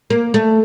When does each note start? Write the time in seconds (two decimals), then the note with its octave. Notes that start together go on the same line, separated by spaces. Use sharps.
0.10 A#3
0.34 A3